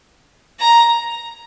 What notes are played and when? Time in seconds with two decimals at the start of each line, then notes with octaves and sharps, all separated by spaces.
0.60 A#5